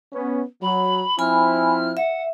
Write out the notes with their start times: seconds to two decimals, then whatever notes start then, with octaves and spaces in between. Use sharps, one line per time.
0.13 B3 C#4
0.62 F#3 B5
1.19 F3 C4 E4 G#5 B5 F6
1.97 E5 F#5